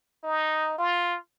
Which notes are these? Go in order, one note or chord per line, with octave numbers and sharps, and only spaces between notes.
D#4
F4